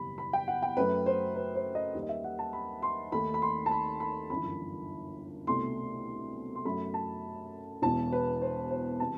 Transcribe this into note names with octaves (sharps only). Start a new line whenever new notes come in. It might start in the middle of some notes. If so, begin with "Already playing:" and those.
Already playing: F#1 E2 B2 G3 B5
B5
G5
F#5
G5
F#2 F#3 A3 B4
C5
B4
C5
D#5
D#2 D#3 G3
D#5
E5
F#5
A5
B5
C6
D#2 D#3 A3 B5
B5
C6
A5
B5
B5
G1 F#2 E3 B5
C2 B2 A3 C6
C6
F#2 F#3 A3 B5
A5
E1 E2 B2 A5
B4
C5
C5
C3 E3 A5